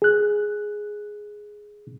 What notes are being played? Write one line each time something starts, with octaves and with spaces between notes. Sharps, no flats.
G#4 F#6